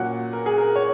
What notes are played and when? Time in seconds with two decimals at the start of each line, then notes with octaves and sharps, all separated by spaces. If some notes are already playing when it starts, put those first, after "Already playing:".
Already playing: A#2 F#3 C#4 F#5
0.33 A#4
0.46 G#4
0.58 A#4
0.76 C#5